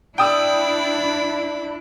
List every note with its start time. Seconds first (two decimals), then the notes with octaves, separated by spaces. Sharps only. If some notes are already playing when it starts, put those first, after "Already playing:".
0.18 D4 E4 D5 G5 B5 D#6 E6